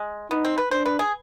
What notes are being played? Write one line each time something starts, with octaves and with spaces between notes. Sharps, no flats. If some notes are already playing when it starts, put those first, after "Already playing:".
Already playing: G#3
B3 D#4
C4
B4
D4 C5
B4
G#4